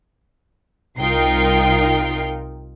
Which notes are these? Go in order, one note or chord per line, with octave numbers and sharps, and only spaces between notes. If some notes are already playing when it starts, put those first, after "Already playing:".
C2 D#4 F4 A#4 G5 C7